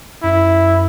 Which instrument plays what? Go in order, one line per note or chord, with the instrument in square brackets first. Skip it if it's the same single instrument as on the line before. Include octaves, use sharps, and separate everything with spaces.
[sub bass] F#2 [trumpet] E4